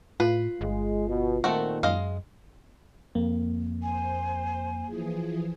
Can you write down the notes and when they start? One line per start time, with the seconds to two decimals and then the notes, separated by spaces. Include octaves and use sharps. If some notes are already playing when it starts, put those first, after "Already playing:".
0.20 A2 F4 B4
0.61 G1 G#3
1.08 B2
1.44 A#2 D#3 A3 C4 F#4
1.83 F#2 G#3 D#5 F5
3.15 F2 A#3
3.83 C5 G#5
4.86 E3 F3 G#4